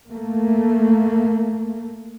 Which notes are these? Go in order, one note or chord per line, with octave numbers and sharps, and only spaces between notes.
A3 A#3